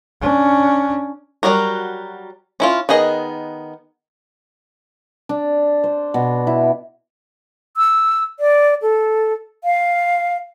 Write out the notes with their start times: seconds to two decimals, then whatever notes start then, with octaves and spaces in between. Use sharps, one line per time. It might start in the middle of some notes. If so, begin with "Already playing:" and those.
0.21 C#4 D4
1.43 F#3 G3 F#4 A#4
2.60 C#4 E4 F4
2.89 D#3 B3 G#4 D#5
5.29 D4
5.84 C5
6.14 B2
6.47 E4
7.77 E6
8.40 D5
8.82 A4
9.64 F5